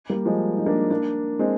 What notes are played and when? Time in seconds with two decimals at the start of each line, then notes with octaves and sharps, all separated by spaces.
0.10 G3 A#3
0.25 F3 G#3
0.57 D#4
0.66 A#3 D4
0.90 A#3 D4
1.39 G#3 C4